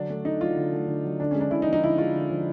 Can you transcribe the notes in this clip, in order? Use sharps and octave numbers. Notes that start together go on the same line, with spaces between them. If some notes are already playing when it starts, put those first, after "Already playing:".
Already playing: D3 F#3 D4
A3
D3 D#4
F#3 F4
D3
A3
D3
F#3
D3 D4
G#3 C#4
D4
D3 E4
D#4
F3
D#4
D3 E4
G#3 F4
D3
F3